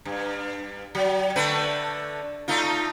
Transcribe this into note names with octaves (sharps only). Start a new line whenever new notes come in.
G2
F#3
D3 A3 B4
A3 D#4 F4